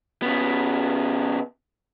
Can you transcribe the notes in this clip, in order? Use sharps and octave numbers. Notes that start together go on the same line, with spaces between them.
C#3 B3